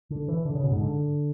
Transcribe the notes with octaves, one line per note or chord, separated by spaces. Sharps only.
D3
E3
D3
C#3
B2
G#2
D3